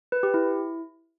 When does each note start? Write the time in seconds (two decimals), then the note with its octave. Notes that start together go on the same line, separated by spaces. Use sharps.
0.12 B4
0.23 G4
0.34 E4